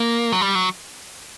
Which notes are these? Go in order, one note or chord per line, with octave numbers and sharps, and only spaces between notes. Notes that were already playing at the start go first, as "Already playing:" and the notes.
Already playing: A#3
F#3
G3
F#3